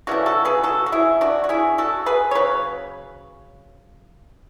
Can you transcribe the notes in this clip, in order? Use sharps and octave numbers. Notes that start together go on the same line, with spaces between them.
C#3 E3 A3 D4 F#4
F#4 A4
G#4 B4
F#4 A4
F#4
E4 G#4
D4 F#4
F#4
E4 G#4
F#4 A4
G#4 B4
C#5
C#3 F#3 B4